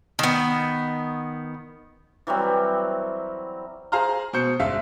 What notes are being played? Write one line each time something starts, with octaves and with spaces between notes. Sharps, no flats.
D#3 B3
E3 F#3 G3 C4
G#4 C5 F5 A#5 C6 F6
B2 C5 G6 C#7
G1 G#3 E5 F5